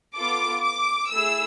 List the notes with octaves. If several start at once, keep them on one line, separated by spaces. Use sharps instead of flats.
B3 F4 A4 D6
D6
A3 E4 G#4 E6